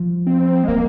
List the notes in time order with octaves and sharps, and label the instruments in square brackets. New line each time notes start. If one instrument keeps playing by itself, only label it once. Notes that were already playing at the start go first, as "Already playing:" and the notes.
Already playing: [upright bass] F3
[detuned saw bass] C4
G#3
[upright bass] D#3 [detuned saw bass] A#3